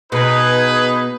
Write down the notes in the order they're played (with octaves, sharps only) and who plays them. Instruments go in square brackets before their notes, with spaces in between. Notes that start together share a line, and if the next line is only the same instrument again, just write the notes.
[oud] B2 [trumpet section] D#4 B4 [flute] G#4